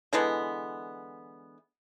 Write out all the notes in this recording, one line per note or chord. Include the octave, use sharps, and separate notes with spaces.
D3 E3 G#3 B3